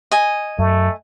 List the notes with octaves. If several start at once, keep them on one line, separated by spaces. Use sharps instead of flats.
D#5 G#5
F#2 A3